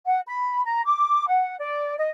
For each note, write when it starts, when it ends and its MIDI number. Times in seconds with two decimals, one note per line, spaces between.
0.05 0.19 78
0.27 0.62 83
0.65 0.81 82
0.85 1.27 86
1.27 1.54 78
1.59 1.94 74
1.98 2.09 75